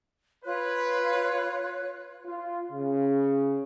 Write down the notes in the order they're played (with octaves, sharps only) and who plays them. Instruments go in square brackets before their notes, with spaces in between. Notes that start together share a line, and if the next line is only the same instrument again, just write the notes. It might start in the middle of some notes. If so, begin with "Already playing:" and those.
[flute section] F4 C#5 F#6 [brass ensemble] B4
[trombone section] F4
C#3